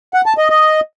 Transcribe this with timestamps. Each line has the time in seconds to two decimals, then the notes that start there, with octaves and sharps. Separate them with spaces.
0.14 F#5
0.26 A5
0.38 D#5
0.50 D#5